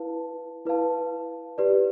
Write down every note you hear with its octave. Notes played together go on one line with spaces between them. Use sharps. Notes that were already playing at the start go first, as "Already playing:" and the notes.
Already playing: E4 B4 F5 A5
E4 B4 F5 A5
G4 B4 D5